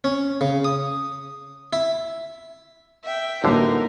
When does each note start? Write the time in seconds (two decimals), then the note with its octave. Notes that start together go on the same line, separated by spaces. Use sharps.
0.04 C#4
0.41 C#3
0.65 D#6
1.73 E4
3.04 E5 G5
3.44 A1 D3 A#3 D#4 F#4 A4 A#4 C5